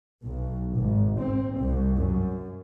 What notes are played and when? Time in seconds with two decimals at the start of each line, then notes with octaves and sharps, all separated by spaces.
0.23 B1
0.74 G#1
1.17 C4
1.56 C2
1.97 F#2